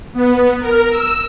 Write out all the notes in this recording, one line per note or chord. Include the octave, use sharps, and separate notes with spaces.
B3
A#4
E6